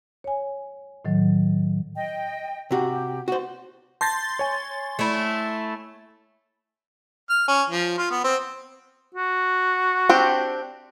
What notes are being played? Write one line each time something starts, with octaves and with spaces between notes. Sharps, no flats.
C#5 G#5
A2 D#3 F#3
D#5 G5
C3 F#4 G4
F#4 C5
A5 C6 G6 A6 A#6
C#5 G#5
A3 E4
F6
C#4
F3
F4
B3
C4
F#4
C4 D4 G4